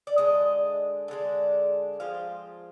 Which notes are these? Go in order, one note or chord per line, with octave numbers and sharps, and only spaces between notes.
D5
D3 G#3 D4 D#5
D3 G#3 D4
F3 G#3 C4 F4 F5